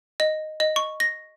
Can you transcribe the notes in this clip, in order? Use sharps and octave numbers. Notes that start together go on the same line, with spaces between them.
D#5
D#5
C#6
A#6